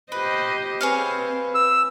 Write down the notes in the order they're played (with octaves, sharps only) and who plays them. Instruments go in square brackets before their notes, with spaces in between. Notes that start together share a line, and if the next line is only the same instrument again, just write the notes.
[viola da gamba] G4 C5 D#5 [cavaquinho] B4
[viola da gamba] C4 [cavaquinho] G#4 C#5 F5 [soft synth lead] B4
[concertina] E6